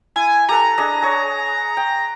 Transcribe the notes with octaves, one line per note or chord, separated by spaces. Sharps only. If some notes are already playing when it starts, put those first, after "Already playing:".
E4 G#5
G4 A4 B4 A#5
D4 G#4 D#5
G#4 C#5
G5